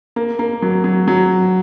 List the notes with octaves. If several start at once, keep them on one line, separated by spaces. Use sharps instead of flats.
A#3
A#3
F#3
F#3
F#3